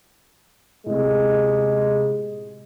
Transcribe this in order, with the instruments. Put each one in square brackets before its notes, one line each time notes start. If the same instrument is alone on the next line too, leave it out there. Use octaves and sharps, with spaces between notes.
[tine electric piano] A2 C3 [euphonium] G#3